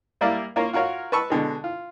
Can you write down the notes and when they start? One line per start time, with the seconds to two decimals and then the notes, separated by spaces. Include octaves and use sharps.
0.21 G3 A#3 E4 A#4 D5 F5
0.56 A#3 F4 A#4 C#5
0.73 F4 F#4 A#4 C#5 F5
1.12 B4 A5 C#6 E6
1.30 B2 D3 G#3
1.64 F4